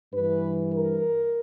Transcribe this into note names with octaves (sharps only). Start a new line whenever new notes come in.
G2 E3 B4
A#4